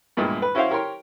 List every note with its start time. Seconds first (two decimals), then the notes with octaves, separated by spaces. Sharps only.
0.17 E2 G2 A#2 G#3
0.42 B4
0.55 C#4 E4 F#4 C5 F5
0.70 G4 A#4 C#5 G5 C6